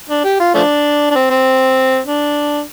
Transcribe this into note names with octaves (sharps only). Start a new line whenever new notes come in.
D4
G4
F4
F3 A3 D4
D4
C4
C4
D4